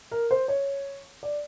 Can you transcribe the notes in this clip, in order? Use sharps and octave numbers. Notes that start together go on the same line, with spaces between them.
A#4
C5
C#5
D5